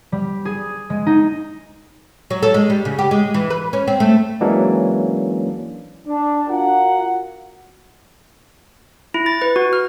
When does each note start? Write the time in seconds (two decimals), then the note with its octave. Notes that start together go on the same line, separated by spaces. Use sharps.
0.12 G3
0.45 G#4
0.90 G#3
1.06 D#4
2.30 F#3
2.43 A4
2.54 G#3
2.70 G3
2.85 C#3
2.99 G4
3.11 G#3
3.34 E3
3.50 B4
3.73 C#4
3.88 C4
4.00 A3
4.41 E3 F#3 G#3 A#3 C#4 D4
6.07 D4
6.48 F4 F#4 A#4 F#5
9.14 E4
9.26 A6
9.42 B4
9.56 F#4
9.73 F6